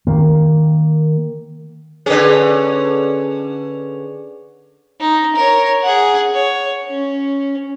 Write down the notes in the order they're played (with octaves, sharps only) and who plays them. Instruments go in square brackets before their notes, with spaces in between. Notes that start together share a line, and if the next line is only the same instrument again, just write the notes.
[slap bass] D#3 A#3
[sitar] D3 C#4 [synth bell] G#4 B4
[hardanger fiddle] D#4
A#4 C#5
G#4 F#5
C#5
C#4